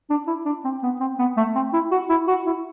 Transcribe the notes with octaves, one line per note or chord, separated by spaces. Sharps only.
D4
E4
D4
C4
B3
C4
B3
A3
C4
E4
F#4
E4
F#4
E4